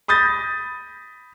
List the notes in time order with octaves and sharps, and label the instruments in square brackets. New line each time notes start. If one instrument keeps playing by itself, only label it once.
[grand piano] B5 D#6 G6 A6 A#6